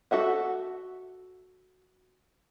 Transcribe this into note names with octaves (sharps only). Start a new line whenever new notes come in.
F#4 A4 E5 F#5